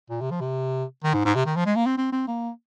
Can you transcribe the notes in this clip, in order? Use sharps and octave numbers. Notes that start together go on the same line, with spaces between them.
A#2
C3
F3
C3
D#3
G#2
G#2
C3
D#3
F3
G#3
A#3
C4
C4
C4
A#3